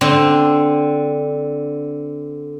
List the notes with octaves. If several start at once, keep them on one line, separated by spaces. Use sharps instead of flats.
D3 C4